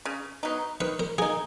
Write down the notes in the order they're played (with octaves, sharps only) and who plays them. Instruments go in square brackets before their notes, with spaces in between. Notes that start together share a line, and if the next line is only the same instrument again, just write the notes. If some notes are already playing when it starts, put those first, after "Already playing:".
[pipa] C#3
F#3 B3 D#4
[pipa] D#3 [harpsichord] B4
[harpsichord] A#4
[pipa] A#3 D#4 [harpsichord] G#4